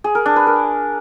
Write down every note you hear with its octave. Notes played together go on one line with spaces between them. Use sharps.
G#4
A#4
D4
B4
A#4